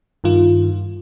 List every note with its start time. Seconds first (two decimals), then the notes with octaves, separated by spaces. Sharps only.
0.24 G2 D#3 F4